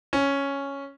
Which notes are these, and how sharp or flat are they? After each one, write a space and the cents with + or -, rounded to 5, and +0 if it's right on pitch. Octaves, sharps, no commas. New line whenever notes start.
C#4 +0